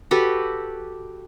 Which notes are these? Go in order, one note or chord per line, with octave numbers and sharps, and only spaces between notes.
F#4 G4 A4 B4